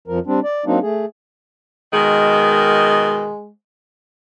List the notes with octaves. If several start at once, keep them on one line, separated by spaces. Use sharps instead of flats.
F2 F3 A#4
G3 C4 D4
D5
F#3 A#3 C4 D4 D#4
A3 G#4
B2 D#3 G#3